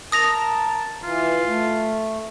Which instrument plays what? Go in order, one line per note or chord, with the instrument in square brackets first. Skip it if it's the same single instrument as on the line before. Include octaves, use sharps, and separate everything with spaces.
[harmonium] A#4 [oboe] A5 [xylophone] D#6 A#6 F7
[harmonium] E3 [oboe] F4
[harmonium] A3